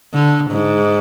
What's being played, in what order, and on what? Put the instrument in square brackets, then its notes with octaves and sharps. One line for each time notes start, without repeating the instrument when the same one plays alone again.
[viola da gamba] D3
G#2